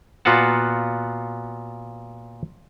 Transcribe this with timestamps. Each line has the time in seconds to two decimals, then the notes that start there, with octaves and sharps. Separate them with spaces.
0.25 A#2 B3 F4 F#4 F#5 A5